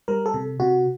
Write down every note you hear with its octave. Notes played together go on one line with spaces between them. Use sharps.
G3 A#4
A4
C3
C3 F#4